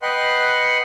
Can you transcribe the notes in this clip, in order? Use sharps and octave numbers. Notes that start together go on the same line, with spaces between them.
B4 D#5 F#5 G5 C6 F#6